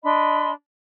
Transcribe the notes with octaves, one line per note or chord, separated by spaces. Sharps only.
D4 D#5 B5 C6